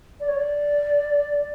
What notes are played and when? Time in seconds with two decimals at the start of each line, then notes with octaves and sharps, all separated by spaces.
0.20 D5
0.28 C#5
0.36 D5